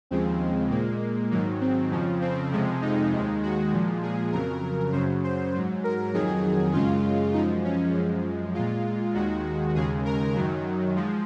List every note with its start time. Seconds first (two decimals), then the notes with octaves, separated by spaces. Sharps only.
0.11 D#2 C#3 F3 G#3 C4
0.70 A#2 G#3 A#3
1.31 G#2 D#3 F#3 A#3
1.61 C4
1.91 F2 C#3 F3
2.21 C4
2.52 F2 C3 F3 G#3
2.82 D#4
3.12 D#2 D#3 G#3
3.43 F#4
3.72 A#2 F3 G#3
4.03 G#4
4.32 F2 C#3 F#3 A#4
4.92 F#2 C#3 F#3 C5
5.24 C5
5.54 G#2 F#3
5.84 A#4
6.13 F2 D#3 F#3 G#4
6.73 F#2 C#3 G#3 F4
7.33 F#2 F3 G#3 D#4
7.64 C#4
7.95 F#2 F3 G#3
8.54 A#2 G#3 F4
9.14 D#2 D#3 G#3 F#4
9.75 D#2 C#3 G#3 G#4
10.05 A#4
10.35 F#2 D#3 F#3
10.96 F3 G#3